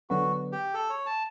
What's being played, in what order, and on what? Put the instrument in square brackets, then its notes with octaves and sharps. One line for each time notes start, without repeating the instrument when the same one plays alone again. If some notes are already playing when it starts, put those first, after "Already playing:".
[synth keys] D3 F#3 B3 [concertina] F#4
[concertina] G4
A4
C#5
A5